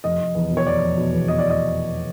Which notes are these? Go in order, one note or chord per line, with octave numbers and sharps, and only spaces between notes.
F1 D#5
F1
E2
B2
C#5
F1 D5
F1
B2
E2
B2 D#5
D5
D#5